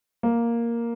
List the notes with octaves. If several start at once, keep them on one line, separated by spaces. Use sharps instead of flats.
A#3